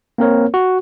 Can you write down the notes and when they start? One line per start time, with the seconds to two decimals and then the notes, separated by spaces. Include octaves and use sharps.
0.18 A#3 C4 A#4 C#5
0.54 F#4